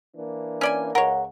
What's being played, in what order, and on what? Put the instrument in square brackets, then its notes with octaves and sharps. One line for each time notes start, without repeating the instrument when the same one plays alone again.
[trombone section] E3 A#3 D4
[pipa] C#4 D5 G#5
[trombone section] C#2 [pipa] A#4 C#5 [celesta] F#5